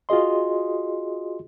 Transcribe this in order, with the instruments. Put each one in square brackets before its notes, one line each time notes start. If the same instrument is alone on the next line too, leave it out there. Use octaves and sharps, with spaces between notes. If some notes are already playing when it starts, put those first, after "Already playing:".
[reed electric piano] F4 F#4 G#4 D#5 C6